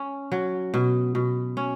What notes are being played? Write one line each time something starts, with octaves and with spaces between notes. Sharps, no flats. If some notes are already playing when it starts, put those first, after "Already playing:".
Already playing: C#4
F#3
B2
B2
C#4